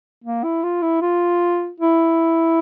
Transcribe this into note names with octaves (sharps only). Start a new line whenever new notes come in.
A#3
E4
F4
E4
F4
E4